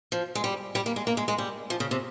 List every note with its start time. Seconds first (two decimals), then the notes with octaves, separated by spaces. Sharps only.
0.12 F3
0.35 G#3
0.44 G3
0.75 G3
0.86 A#3
0.96 G#3
1.07 A#3
1.17 G#3
1.28 G#3
1.38 G3
1.70 F3
1.80 C#3
1.91 C3